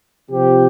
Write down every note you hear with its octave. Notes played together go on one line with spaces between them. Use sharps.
C3 F3 C4 G4